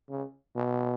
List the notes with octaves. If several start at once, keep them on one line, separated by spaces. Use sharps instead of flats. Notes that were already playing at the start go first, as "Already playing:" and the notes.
C#3
B2